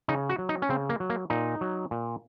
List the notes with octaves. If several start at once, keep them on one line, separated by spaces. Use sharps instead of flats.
C#3 D#4
F#4
F#3
D#4
C#4
C#3 C4
A#3
F#3
A#3
A#2 D#4
F#3
A#2